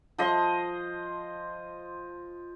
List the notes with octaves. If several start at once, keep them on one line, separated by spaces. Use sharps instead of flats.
F3 D#5 C6